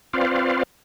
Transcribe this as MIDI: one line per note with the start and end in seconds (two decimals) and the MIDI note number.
0.13 0.63 60
0.13 0.63 65
0.13 0.63 71
0.13 0.63 72
0.13 0.63 74
0.13 0.63 77